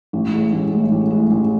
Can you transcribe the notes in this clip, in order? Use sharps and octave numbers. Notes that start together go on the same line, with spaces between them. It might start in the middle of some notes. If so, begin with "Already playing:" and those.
A1
A2 G#3
A1
A2 G#3
A1
G#3
A2
A1